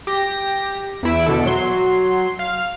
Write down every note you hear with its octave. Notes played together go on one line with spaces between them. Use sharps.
G4 A#6
E2 E4 D7
B2 D3 A4
F#3 C6
F5